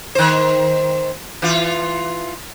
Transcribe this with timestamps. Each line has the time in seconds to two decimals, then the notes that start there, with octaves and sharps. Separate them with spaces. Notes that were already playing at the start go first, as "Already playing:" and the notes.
0.15 D#3 C5
1.42 E3 F4